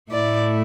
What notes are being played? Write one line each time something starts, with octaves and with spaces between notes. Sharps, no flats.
A2 A3 E4 D5